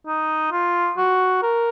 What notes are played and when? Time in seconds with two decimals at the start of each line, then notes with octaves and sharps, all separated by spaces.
0.07 D#4
0.51 F4
0.97 F#4
1.42 A#4